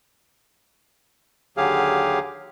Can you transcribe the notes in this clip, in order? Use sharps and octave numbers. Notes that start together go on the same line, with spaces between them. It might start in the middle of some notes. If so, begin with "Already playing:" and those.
D#2 D3 F#3 G4 G#4 F5